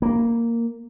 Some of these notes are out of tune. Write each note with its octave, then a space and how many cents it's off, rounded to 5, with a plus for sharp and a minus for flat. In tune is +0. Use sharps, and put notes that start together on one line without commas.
A#3 -5